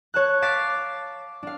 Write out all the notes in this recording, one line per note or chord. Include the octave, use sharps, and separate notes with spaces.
C#5 A5 F#6
F5 A5 D6 A6 B6
D4 F5